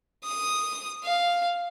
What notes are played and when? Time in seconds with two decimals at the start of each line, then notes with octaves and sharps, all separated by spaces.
0.24 D#6
1.03 F5